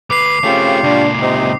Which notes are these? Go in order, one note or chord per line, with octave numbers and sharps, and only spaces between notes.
D2 B4 D6 C7
C#3 A3 C4 F4 G4 C#6
C#2 A#2 D4
C3 C4 D#4 D#5